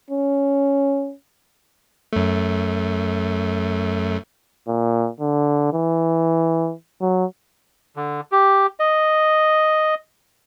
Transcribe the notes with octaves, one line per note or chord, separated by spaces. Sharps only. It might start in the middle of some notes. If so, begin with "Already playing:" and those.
C#4
F#2 A3
A#2
D3
E3
F#3
D3
G4
D#5